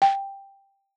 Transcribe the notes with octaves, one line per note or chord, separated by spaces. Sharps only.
G5